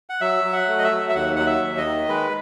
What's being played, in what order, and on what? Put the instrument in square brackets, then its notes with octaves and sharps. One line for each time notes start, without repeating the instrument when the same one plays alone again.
[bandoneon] F#5
F#3 E5
F#3
F#5
A3
D#5
E5
F#3
E5
D#2 F#5
F#3 F#5
E5
D#2
D#5
D#3
G#3 B4